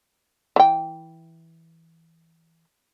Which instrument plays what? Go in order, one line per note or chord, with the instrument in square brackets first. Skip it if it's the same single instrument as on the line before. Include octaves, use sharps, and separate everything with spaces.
[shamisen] E3 G5